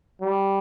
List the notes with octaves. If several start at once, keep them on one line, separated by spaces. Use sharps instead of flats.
G3